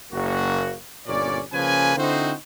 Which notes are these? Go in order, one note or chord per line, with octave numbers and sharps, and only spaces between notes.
F#1 A#3 F#4
G1 A#2 C#4 C#5 D5
C#3 F3 A#3 C#4 B4 G#5
D3 C4 D#4 E4 F#4 C5